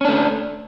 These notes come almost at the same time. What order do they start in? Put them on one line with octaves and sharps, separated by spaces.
C#4 D4 A3